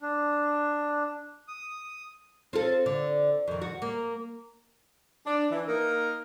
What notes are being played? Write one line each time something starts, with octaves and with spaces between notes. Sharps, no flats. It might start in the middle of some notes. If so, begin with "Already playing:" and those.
D4
D#6
C4 F4 A4
D3
F2 D#3
F#4
A#3
D4
E3
A#3 D#4 A#4